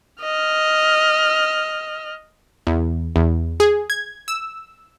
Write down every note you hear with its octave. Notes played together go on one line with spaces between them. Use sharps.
D#5 F6
E2
E2
G#4
G#6
E6